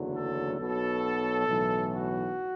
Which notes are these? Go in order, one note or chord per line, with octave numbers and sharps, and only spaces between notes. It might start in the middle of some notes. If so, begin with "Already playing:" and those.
Already playing: F#1 E2 D3 F#3
A4
B1 B2 F#3 A4
B1 A2 E3
F#4